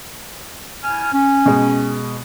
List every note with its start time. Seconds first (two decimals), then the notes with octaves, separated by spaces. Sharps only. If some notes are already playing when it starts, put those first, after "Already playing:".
0.83 A2 G#5 F6
1.12 C#4
1.46 B2 G#3